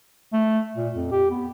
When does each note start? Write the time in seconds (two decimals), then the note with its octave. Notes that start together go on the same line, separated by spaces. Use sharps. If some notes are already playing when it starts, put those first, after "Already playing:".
0.33 A3
0.76 A#2
0.94 F2
1.11 G4
1.30 B3